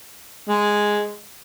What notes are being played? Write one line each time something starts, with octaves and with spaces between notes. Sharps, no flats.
G#3